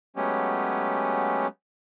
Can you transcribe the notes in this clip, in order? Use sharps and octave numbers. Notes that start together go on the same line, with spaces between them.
F#3 G#3 A3 B3 C#4 G4